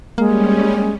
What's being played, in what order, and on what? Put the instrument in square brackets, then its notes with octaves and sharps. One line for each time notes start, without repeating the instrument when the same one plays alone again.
[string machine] G3 C#4 [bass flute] G#3 [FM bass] A#3